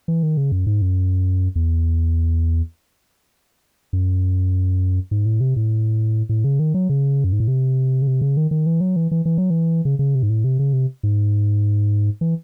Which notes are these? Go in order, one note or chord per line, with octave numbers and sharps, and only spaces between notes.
E3
D#3
C#3
F#2
G#2
F#2
E2
F#2
G#2
A2
C3
A2
A2
C#3
D#3
F#3
C#3
F#2
G#2
A2
C3
C#3
C3
C#3
D#3
D#3
E3
F#3
E3
E3
E3
F#3
E3
C#3
C#3
C3
G#2
A2
C3
C#3
C3
G#2
E3